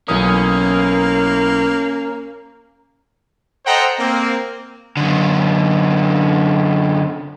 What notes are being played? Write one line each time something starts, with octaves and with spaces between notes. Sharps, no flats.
B1 E3 A#3 C#4 D#6
A4 C5 D#5 F#5 G5 A#5
A#3 C4
F#2 D3